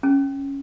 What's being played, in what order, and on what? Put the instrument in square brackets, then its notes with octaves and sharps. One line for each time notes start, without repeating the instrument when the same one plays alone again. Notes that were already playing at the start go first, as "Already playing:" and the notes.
[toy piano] C#4